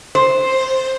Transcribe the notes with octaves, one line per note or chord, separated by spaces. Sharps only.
C5